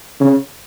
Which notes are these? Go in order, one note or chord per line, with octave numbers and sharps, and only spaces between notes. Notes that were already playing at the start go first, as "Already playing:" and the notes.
C#3